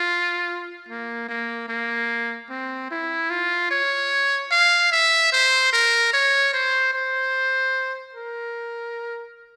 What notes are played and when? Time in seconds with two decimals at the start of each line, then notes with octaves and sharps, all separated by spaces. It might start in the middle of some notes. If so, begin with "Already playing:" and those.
Already playing: F4
0.88 A#3
1.28 A#3
1.69 A#3
2.50 C4
2.91 E4
3.30 F4
3.71 C#5
4.51 F5
4.92 E5
5.32 C5
5.73 A#4
6.13 C#5
6.53 C5
6.94 C5
8.14 A#4